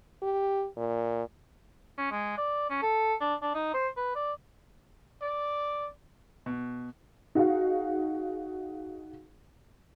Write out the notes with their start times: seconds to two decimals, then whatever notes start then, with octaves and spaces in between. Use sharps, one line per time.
0.22 G4
0.77 A#2
1.98 C#4
2.11 G#3
2.38 D5
2.70 C#4
2.82 A4
3.20 D4
3.42 D4
3.55 D#4
3.74 C5
3.97 B4
4.15 D5
5.22 D5
6.46 B2
7.35 D#4 F#4 G#4 F5